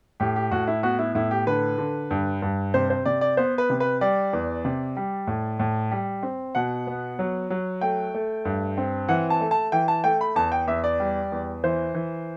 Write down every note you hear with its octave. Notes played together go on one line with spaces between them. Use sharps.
A2 G4
G4
A2 F#4
E4
B3 F#4
E4
A2 E4
G4
D3 B4
D3
G2
G2
C3 C5
C5
C3 D5
D5
B3 C5
B4
C3
B4
G3 D5
E2
C3
G3
A2
A2
G3
C4
B2 F#5
B3
F#3
F#3
A3 G5
A3
G2
C4
E3 F#5
A5
A3
A5
E3 G5
A5
A3 G5
B5
E2 A5
G5
E2 E5
D5
G3
E2
E3 C5
E3